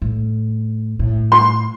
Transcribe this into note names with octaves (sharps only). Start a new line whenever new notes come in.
A2
A2
C6